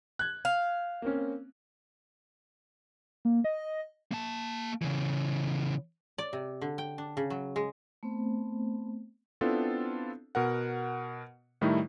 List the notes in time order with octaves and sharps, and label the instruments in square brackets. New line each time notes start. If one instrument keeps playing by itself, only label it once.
[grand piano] F#6 G#6
[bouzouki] F5
[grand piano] A#3 C4 C#4
[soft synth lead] A#3
D#5
[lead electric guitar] A#3 A5
C#3 E3
[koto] D5
C3
D3
G5
D4
C#3
F#3
G#3
[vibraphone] A3 B3 C4 C5
[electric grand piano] B3 C4 D4 E4 F4 A4
B2 A#4 F#5
A2 D#3 G3 A3 D#4 E4